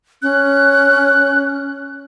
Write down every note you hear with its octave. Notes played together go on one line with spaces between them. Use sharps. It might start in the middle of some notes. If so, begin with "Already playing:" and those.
C#4 F#6